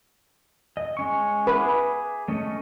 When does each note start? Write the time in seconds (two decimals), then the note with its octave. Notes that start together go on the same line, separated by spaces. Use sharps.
0.77 D#5
0.97 G#3 C#4 C#6
1.47 G#4 B4 E5 D6
2.28 A3 C#4 D#5